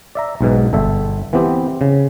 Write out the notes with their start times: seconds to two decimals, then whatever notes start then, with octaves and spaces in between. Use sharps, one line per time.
0.15 D5 E5 A#5
0.41 B1 G#2 B2
0.73 G1 A4 E5
1.33 E3 B3 C4 G4
1.81 C#3